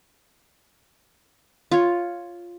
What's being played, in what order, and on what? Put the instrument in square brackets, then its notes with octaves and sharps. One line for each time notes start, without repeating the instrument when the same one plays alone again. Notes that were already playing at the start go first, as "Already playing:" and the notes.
[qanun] F4 C#5